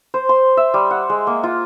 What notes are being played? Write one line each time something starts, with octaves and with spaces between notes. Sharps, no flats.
C5
C6
E5
G3
F#5
G#3
A#3
F4